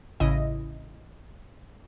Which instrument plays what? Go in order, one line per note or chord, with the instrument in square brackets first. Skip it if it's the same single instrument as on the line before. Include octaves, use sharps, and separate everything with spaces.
[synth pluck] A1 C#3 E4 D#5